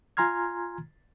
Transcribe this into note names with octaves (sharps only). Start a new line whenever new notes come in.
F4 G#5 A#5 C6 F6 G#6